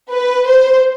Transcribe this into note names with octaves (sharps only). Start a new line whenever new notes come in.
B4
C5